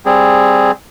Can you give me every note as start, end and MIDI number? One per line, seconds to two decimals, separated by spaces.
0.05 0.71 55
0.05 0.71 60
0.05 0.71 68